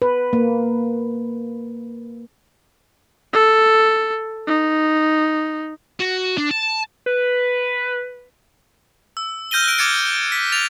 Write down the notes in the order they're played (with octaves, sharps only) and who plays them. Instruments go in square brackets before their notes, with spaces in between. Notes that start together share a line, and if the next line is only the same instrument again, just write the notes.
[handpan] B4
A#3
[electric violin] A4
D#4
[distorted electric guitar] F#4
D4
A5
[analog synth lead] B4
[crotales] E6
F6 G6 A#6 D#7 G7
F#6 D7
D6 F6 G#6 A6 C#7 D7
B6
A6 F7